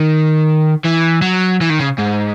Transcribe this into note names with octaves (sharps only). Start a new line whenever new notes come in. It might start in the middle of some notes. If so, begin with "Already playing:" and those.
Already playing: D#3
E3
F#3
E3
D#3
C#3
G#2